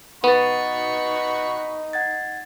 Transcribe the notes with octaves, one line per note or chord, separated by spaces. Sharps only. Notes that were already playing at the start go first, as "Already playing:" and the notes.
B3 D#4 B4 F#5 B5 C#6 A6
F#5 G#6 A6